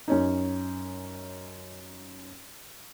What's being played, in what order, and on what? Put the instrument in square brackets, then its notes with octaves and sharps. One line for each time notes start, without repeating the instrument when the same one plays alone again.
[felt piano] F#2 C#4 D#4